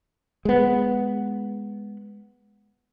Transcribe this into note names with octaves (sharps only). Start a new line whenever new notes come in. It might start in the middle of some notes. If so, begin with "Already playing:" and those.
G#3 B3